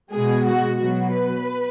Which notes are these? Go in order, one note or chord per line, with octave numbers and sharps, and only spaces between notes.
B2 G#3 G#4
F#4
B2 F#3 F#4
B4